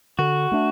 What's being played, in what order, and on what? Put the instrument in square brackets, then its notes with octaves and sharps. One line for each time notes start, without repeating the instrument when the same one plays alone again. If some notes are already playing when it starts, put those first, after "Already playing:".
[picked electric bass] D3 [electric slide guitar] F#4
[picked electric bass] A3 D4